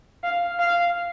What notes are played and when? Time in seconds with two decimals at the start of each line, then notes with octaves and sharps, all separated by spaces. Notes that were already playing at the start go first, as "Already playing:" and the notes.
0.23 F5
0.60 F5